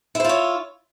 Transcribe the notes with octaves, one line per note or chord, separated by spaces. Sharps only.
E4 F4 C5 C#5